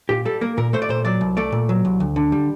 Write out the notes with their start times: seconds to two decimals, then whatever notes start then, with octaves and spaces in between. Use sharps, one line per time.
0.09 A#2 G4
0.25 G3 A4
0.41 A#3 A#4
0.58 A#2 A#4
0.73 A3 C5
0.82 D5
0.89 A#2 C5
1.05 F#3 D5
1.21 C2
1.37 A3 D5
1.52 A#2
1.69 F#3
1.85 C2
2.00 D2
2.16 D3
2.32 G3